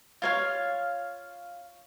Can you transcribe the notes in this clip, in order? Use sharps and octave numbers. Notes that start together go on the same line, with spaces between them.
F4 C#5 F5